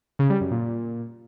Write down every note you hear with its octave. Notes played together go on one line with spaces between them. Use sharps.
C#3
G3
F#2
A#2